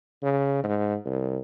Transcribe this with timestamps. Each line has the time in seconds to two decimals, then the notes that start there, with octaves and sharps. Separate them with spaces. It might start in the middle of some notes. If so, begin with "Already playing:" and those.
0.23 C#3
0.64 G#2
1.05 C2